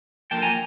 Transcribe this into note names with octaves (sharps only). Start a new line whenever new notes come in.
D3 F3 A#3 G5 A5
G#5 A#5